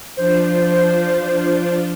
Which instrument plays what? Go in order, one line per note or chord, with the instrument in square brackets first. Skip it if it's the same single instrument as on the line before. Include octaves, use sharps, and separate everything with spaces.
[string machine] F3 D4 F4 [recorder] C5